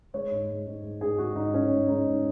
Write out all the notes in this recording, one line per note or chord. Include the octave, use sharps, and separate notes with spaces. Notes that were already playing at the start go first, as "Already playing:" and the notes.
G#3 C#5
G#2
G#3
G#2
G#3
G#2 G#4
G#3 F#4
G#2 D#4
G#3 C#4
G#2
G#3 D#4
G#2